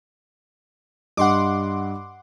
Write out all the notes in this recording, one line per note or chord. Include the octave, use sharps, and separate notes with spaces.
G2 D#5 F#5 C6 D6